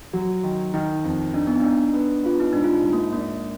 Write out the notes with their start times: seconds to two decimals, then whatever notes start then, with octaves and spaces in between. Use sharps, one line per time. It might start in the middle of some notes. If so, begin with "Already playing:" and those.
0.13 F#3 F#4
0.44 D#3
0.74 D#3 D#4
1.04 F2
1.34 D4 D#4
1.47 B3
1.60 D4 D#4
1.93 B3
2.23 B3 F4
2.40 D#4
2.53 G#2 D4
2.64 F4
2.73 D#4
2.84 G#2
2.93 A#3
3.13 A#3 D4